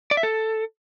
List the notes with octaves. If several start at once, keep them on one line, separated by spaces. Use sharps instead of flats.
D5
E5
A4